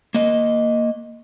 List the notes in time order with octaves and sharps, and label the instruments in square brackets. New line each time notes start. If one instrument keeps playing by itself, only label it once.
[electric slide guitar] A#3 D#5